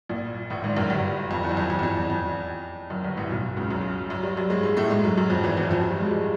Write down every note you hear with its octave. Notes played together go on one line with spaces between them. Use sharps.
A#1 A#2
A1 A2
G#1 G#2
F#1 F#2
G1 G2
F2
E2
F#2
F2
F2
E2
F2
E2
F2
F#1 F#2
G1 G2
A1 A2
B1 B2
C#2 C#3
F#2 F#3
F#2 F#3
G2 G3
F#2 F#3
G#2 G#3
G#2 G#3
A2 A3
G#2 G#3
F#2 F#3
F#2 F#3
F2 F3
E2 E3
E2 E3
F2 F3
F#2 F#3
G2 G3
G#2 G#3
G#2 G#3